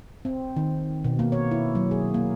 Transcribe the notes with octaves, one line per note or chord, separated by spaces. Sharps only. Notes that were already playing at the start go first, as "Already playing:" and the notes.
C4
D#3
B2
A#3
C#5
E4
F#3
G#4
A#3